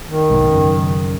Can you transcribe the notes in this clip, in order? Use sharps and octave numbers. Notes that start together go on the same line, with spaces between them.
D#3
B1 G#2 B2
F#2 C#3